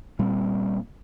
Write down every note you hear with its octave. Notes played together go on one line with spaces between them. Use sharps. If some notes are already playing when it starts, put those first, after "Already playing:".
A#2 G3 C4